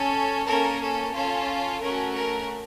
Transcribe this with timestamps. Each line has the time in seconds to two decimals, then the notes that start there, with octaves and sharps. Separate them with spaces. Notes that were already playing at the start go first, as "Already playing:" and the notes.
Already playing: C#4 A4
0.46 A#3 C#4 A4 A#4
0.81 A4
1.13 C#4 F4 A4
1.81 A3 C#4 F#4 A#4
2.15 A#4